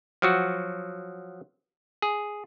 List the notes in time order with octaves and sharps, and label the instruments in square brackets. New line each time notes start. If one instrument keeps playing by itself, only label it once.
[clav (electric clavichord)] F3 F#3 F#4
G#4